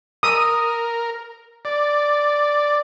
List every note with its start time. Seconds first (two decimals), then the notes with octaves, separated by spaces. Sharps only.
0.23 A#4 D#6 E6
1.65 D5